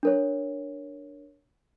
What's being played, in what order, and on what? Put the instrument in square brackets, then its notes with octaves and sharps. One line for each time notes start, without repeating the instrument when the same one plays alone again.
[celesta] D4 A#4 C#5